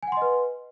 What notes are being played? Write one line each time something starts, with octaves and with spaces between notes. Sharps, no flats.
B4 D#5 F#5 G#5 C6